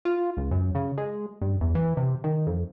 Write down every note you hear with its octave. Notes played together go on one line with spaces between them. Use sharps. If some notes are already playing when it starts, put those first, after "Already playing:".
F4
C#2
F#2
C#3
G#3
G2
E2
E3
C3
D#3
F2